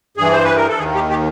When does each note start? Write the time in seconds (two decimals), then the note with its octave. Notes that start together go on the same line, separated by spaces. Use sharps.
0.17 G2 E3 G#4
0.33 C5
0.44 B4
0.56 A#4
0.68 A4
0.79 D#2 D#3 G#4
0.95 G4
1.10 G4